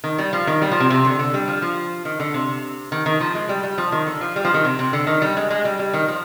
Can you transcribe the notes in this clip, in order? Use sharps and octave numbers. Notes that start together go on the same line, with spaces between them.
D#3
G3
F3
D#3
G3
F3
C3
C3
D3
D3
G3
F3
F3
D#3
D3
C3
D#3
D#3
F3
G#3
G3
G3
F3
D#3
D3
F3
G3
F3
D#3
C3
C3
D3
D#3
G3
G#3
G#3
G3
G3
D#3
F3